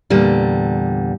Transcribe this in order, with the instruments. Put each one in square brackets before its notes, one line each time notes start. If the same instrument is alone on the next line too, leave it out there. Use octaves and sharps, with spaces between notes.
[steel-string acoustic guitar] E2 A#2 D3 G3